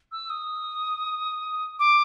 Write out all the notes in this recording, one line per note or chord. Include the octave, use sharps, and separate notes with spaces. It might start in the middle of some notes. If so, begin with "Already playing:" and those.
E6
D#6
D6